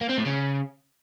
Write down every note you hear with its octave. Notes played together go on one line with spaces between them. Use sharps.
A#3
C4
A2
C#3